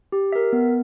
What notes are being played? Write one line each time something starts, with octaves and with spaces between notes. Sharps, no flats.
G4
A#4 E5
B3